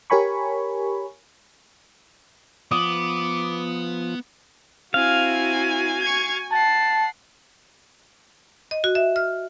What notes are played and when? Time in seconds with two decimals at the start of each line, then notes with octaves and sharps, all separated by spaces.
0.10 G4 A#4 C#5 G#5 B5 C#6
2.72 F3 B3 D6 D#6
4.94 C4 E4 F#4 F5 G#5
6.01 C#6 G#6
6.52 F#5 A5 C7
8.71 D#5
8.84 F#4
8.95 E5
9.16 F6